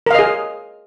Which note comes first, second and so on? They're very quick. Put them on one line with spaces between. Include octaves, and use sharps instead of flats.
A#4 F5 D#5 G#4